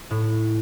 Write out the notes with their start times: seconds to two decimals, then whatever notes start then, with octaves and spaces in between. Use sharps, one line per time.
0.10 A2